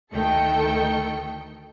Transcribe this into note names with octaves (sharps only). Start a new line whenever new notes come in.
D2 D#3 A3 A4 G5 C#7